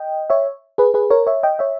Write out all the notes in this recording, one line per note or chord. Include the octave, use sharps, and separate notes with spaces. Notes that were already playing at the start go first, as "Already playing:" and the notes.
Already playing: D#5 G5
C#5 E5
G#4 B4
G#4 B4
A#4 C#5
C#5 E5
D#5 G5
C#5 E5